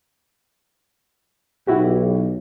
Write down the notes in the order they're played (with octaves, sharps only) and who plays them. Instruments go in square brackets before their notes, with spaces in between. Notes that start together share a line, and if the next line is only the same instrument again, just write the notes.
[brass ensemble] B1 [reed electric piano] E4 F#4 G4